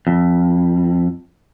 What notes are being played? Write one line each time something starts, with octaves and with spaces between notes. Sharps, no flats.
F2